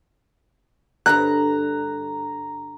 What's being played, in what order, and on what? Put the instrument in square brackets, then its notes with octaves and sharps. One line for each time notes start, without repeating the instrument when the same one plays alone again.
[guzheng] G2 D3 G3 [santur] A#5 [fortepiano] F#6